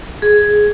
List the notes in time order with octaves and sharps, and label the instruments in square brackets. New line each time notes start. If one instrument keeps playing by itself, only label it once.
[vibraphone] G#4